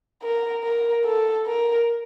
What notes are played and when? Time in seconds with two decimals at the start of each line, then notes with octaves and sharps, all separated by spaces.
0.22 A#4
0.64 A#4
1.05 A4
1.47 A#4